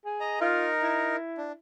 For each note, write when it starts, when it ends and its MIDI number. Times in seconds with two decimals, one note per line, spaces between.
0.05 0.40 68
0.20 0.40 75
0.20 0.40 82
0.40 1.16 63
0.40 0.68 65
0.40 1.16 70
0.82 1.57 64
1.37 1.52 62